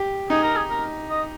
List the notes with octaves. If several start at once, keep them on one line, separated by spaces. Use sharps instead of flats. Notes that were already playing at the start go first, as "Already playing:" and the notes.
Already playing: G4
D#4 G#4
A#4
G#4
A#4
D#5